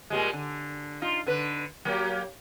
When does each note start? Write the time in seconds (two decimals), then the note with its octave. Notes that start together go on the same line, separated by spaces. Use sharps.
0.10 A#2 G3 G#3
0.33 D3
1.02 D#4 F4
1.27 D3 B4
1.85 F#3 A#3 G4